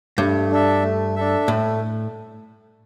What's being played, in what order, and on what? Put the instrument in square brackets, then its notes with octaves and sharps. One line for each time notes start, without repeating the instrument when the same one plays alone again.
[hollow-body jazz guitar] G2 [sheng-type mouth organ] A3
[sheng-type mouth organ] D4 A4 E5
A3
D4 A4 E5
[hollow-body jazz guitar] A2 [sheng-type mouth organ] A3